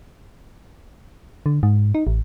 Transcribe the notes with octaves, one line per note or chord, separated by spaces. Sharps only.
D3
G#2
D#4
A1